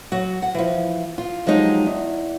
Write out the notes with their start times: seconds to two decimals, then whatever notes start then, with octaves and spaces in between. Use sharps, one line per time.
0.12 F#3 F#4
0.42 F#5
0.55 E3 F3
1.18 F4
1.47 F3 F#3 G#3 D#4 G4
1.86 E2